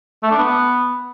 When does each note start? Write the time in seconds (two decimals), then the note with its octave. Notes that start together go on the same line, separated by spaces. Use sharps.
0.23 A3
0.31 D4
0.39 B3